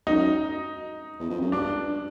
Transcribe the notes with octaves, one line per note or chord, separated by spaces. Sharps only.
F#2 D#4
E2
F2
F#2
G2 D4